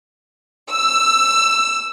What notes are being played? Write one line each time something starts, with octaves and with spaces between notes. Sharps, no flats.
E6